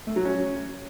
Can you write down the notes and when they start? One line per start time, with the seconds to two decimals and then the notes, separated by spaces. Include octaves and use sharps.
0.07 A3
0.16 F#3
0.25 C#4